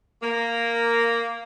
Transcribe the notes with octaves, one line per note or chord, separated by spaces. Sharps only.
A#3